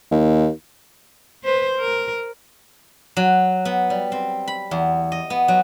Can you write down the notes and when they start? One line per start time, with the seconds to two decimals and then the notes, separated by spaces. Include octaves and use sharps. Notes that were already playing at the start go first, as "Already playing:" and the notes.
0.11 D#2
1.44 B4 C5
1.78 A#4
3.17 F#3
3.65 B3
3.90 G3
4.12 C4
4.48 B5
4.71 E2
5.12 D#5
5.30 B3
5.48 F#3